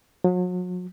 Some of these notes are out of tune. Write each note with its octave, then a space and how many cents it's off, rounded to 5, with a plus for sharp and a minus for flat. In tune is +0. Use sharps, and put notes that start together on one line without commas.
F#3 -40